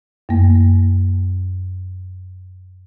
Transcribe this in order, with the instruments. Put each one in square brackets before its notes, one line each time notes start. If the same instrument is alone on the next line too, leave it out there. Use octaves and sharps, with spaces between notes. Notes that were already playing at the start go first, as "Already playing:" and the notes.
[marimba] F#2 A#3